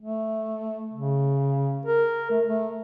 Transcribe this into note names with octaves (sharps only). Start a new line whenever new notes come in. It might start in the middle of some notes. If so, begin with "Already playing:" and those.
A3
C#3
A#4
A3
A3